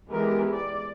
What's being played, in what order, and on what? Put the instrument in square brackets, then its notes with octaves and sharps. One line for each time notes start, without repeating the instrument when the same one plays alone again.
[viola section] E3 G#3 B3 G4 A#4
D5